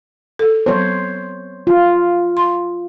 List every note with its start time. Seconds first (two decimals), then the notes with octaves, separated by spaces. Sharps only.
0.39 A4
0.66 F#3 B3 C5 C#5
1.67 F4
2.37 C6